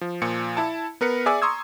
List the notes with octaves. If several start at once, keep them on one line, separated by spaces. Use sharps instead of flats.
F3
A#2 F3 C#7
E4 A5
B3 A#4 B4 C#7
G#4 D5 E5 G#5 D6 E6
A#5 C6 C#6 D#6 E6 G#6